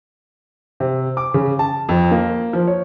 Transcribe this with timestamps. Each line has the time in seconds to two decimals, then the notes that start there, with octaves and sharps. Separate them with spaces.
0.80 C3
1.17 D6
1.34 C#3
1.59 A5
1.89 F2
2.11 A#3
2.53 F3
2.68 C#5